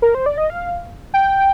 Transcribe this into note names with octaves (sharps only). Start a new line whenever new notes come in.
A#4
C5
D5
D#5
F5
G5